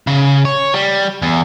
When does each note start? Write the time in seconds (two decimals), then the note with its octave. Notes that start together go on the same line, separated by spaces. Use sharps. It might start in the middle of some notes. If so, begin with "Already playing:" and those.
0.07 C#3
0.45 C#5
0.74 G3
1.22 E2